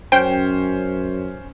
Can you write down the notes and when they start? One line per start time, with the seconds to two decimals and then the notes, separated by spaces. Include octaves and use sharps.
0.12 F#2 C#4 C5 G5